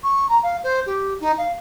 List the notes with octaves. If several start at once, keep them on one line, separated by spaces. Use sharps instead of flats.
C#6
A#5
F5
C5
G4
D#4
F5